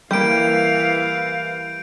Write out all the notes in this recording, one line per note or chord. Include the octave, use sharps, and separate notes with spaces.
E3 G3 A#3 F5 G6 D7